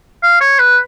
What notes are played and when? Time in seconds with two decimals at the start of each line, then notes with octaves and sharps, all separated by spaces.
0.23 F5
0.41 C#5
0.60 B4